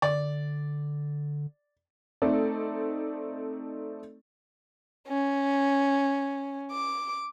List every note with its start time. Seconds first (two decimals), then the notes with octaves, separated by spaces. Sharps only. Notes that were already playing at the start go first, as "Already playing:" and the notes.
0.02 D3 D5
2.22 A3 C4 D#4 A4 D5
5.07 C#4
6.72 D6